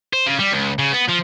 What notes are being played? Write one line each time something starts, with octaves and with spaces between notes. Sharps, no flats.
C5
C#3
G3
C#2
C#3
B3
F3